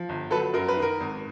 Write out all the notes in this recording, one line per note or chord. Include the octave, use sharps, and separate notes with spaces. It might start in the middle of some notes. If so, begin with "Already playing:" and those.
Already playing: F3
G1
F#3 A4 B4
F#2 A#4
B4
D#3
A#4
G#1